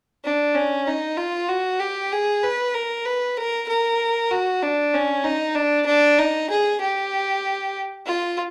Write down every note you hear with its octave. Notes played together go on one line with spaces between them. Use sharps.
D4
C#4
D#4
F4
F#4
G4
G#4
B4
A#4
B4
A#4
A#4
F#4
D4
C#4
D#4
D4
D4
D#4
G#4
G4
F4